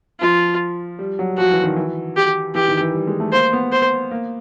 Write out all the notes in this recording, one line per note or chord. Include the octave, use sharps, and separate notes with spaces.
F3 F4
G3
F#3
F3 F#4
E3
D#3
E3
G4
E3 G4
D#3
E3
G3
G#3
A3
A#3 C5
B3
C5
A#3